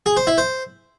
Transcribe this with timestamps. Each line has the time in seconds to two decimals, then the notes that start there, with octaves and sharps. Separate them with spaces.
0.06 G#4
0.17 C5
0.27 E4
0.38 C5